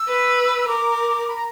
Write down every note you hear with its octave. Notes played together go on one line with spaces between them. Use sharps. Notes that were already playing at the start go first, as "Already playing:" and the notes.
Already playing: E6
B4
A#4 D6
B5
A#5